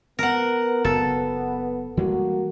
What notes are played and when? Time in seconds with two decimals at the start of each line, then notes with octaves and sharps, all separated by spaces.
0.19 B3 A#4 F#5
0.85 F#1 B3 A4
1.97 E3 G3 G#3 A#3 F#4